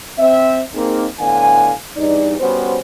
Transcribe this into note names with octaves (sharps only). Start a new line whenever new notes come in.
C4 E5
A#3 C4 D#4 G#4
A2 D3 B3 F5 G#5
E2 G2 D#4 D5
G3 B3 C#4 F#4 C5